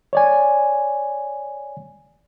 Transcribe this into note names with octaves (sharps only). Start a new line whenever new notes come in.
C#5 D5 G#5